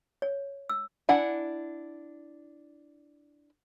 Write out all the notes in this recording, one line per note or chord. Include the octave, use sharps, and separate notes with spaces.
C#5
E6
D4 E4 F#5 G#5